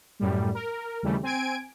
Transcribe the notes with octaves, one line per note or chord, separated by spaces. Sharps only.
F#2 A2 G3
A#4
D#2 C#3 E3 G3 A3
C4 G#5 G#6 D7